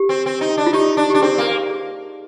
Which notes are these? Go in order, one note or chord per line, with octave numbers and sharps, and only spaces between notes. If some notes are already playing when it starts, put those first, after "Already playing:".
Already playing: G4
C4
C4
D#4
D4
F4
D#4 G4
D4
D4 G4
C4 G#4
A#3
G#4